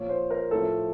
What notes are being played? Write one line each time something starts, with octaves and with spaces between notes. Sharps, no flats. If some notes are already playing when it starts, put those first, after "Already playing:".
Already playing: A#2 F3 C#5
C5
A#4
A2 F3 A4